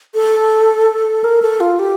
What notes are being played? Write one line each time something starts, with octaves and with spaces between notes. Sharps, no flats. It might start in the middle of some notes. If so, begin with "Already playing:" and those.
A4
A#4
A4
F4
G4